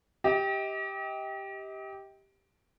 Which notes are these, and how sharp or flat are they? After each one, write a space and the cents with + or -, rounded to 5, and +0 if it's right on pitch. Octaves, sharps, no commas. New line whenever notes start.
G4 +0 D#5 +40